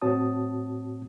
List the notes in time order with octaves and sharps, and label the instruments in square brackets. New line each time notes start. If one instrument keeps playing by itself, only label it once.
[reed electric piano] A2 C4 F#4 C#5 A5 D#6